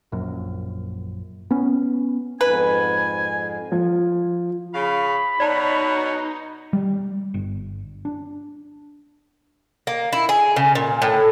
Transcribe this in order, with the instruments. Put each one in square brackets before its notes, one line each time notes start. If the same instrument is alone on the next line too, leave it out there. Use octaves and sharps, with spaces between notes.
[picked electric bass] A#1 F#2
B3 C#4
[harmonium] F2 G#2 [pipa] B4 [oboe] G#5
[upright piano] F3
[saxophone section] C#3 F5 [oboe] B5
[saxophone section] B2 F#4 C#5 [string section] D#4 [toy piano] D5 A5 A#5
[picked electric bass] G3
G1
D4
[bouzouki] A#3
E4
G#4
C#3
A#2
A2